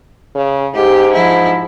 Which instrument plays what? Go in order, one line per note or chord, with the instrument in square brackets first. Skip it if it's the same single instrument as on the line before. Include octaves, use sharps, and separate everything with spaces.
[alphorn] C#3
[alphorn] G#2 [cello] G4
[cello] F3 E4